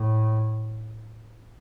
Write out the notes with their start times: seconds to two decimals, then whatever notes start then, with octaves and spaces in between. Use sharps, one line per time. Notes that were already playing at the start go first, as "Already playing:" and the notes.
Already playing: A2